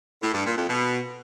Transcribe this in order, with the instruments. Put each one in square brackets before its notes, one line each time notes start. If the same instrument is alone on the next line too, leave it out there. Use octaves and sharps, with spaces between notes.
[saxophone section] A2
G2
A#2
F2
B2